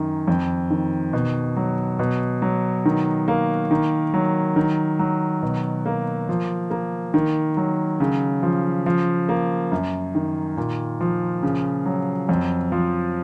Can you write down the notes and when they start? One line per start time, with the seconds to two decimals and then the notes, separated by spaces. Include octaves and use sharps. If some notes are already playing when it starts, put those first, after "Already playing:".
Already playing: F#2 D#3
0.28 F2
0.70 D#3
1.13 B2
1.56 F#3
1.99 B2
2.42 F#3
2.85 D#3
3.28 A#3
3.71 D#3
4.14 F#3
4.56 D#3
4.99 F#3
5.42 B2
5.86 A#3
6.29 F3
6.71 A#3
7.14 D#3
7.57 F#3
8.00 C#3
8.43 F3
8.86 F3
9.29 A#3
9.72 F#2
10.15 D#3
10.57 A#2
11.01 F3
11.43 C#3
11.86 F#3
12.29 F2
12.72 F3